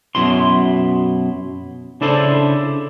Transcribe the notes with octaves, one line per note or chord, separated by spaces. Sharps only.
F#2 B2 E4 C6
C#3 D4 E4 A4 C5